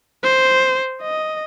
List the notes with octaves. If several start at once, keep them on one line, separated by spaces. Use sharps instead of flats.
C5
D#5